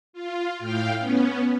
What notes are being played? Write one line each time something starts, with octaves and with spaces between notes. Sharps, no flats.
F4
A2 F5 G5
B3 C#4